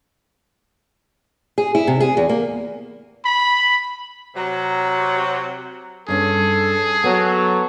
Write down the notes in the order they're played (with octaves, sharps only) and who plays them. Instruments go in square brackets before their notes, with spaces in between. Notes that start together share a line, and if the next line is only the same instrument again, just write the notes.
[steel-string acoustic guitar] G#4
E4
C3
G#4
E2
A#3
[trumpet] B5
[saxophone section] C3 F#3
[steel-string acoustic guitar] G2 C#4 [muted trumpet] G#4 [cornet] A4
[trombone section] F#3 [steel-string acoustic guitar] B3 [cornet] A4